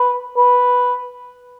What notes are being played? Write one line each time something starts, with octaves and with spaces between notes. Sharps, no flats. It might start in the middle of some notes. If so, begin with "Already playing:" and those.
Already playing: B4
B4